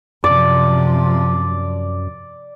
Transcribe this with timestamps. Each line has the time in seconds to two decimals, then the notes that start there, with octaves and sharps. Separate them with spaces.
0.24 F#2 C3 F3 D5